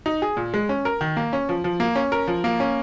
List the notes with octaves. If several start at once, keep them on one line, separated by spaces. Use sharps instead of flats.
D#4
G#4
A#2
G#3
C#4
A#4
D#3
A#3
C#4
F3
F3
A#3
C#4
A#4
F3
A#3
C#4